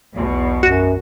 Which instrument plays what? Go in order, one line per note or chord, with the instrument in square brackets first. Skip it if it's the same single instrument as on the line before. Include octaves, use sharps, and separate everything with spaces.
[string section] B1 E2 B2
[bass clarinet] F#2 [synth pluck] F#4